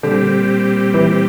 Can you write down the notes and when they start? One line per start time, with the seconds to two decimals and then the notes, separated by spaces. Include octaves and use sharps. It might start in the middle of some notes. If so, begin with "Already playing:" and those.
0.03 A#2 D3 G3 C4 G4
0.94 E3